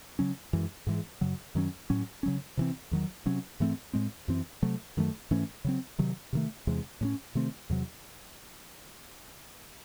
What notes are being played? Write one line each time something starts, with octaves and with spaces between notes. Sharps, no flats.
C#3 F#3 C#4
F#2 E3 G#3
G#2 E3 G#3
F#2 C#3 F#3
F#2 D#3 F#3 C#4
A2 F#3 C#4
C#3 F#3 C#4
C3 E3 C4
E2 D#3 F#3
C3 F#3 C#4
G#2 E3 A3 C4
A2 G#3 C4
F#2 E3 C4
C3 F#3 A3
F#2 D#3 F#3 A3
G#2 E3 A3 C#4
C#3 F#3 C4
C3 D#3 F#3
C3 D#3 A3
E2 C3 E3 G#3
A2 G#3 C#4
C3 D#3 A3 C4
E2 C3 F#3